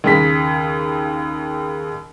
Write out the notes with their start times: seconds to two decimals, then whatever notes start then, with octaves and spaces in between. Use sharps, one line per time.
0.04 D#2 C#3 B6